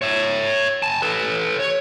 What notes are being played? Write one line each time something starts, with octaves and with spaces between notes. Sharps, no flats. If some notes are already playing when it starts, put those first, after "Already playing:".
C#5 E5
G#5 A5
A4 B4
C#5